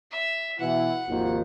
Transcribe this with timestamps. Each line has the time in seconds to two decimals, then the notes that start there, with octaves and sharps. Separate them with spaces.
0.11 E5
0.59 B2 E3 E4 F#5
1.08 G#1 D#2 F3